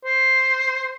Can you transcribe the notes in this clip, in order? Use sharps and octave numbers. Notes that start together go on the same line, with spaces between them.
C5